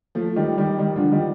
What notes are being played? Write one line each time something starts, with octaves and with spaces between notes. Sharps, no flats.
F3 A3
D#3 G3
D#3 G3
D#3 G3
D3 F3
D#3 G3